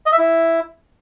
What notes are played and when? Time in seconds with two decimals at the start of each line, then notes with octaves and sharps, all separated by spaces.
0.06 D#5
0.12 E5
0.18 E4